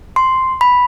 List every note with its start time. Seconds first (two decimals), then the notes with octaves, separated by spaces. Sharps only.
0.16 C6
0.61 B5